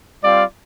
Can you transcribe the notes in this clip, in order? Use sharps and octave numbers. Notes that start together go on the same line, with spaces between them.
G3 C4 F4 D5 F5